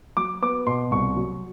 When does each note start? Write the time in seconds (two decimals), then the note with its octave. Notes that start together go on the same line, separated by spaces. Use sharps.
0.17 F#3 D6
0.42 B3 D6
0.67 B2 C6
0.91 C2 C#6
1.16 F#3